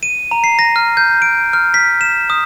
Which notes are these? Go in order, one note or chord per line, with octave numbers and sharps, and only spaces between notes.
D#7
A#5
C7
A#6
F6
G6
D7
F6
B6
E7
D#6